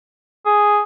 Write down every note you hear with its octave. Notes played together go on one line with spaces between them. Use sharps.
G#4